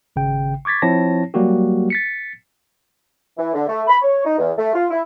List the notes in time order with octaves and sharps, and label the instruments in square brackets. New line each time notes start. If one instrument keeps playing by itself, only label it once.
[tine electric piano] G#1 C#3 G5
C#6 D6 G#6 A6 B6
F3 C4 E4 C#5 A5 A#6
F#3 G3 A#3 F#4 G4
A6 B6 C#7
[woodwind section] E3
D3
A3
B5
C#5
D#4
E2
A3
F4
E4